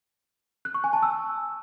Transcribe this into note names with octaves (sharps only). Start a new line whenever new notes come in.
F#6
C#6
G#5
A5
E6